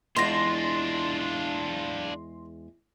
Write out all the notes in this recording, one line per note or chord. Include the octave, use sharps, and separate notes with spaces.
E2 G#3 D4 F4 C6 A#6